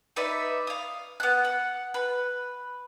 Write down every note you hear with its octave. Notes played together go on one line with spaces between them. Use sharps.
D#4 B4 D5 E5
F5 D#6
B3 F#6
F#5
B4